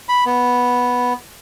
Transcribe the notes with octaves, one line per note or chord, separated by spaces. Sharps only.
B5
B3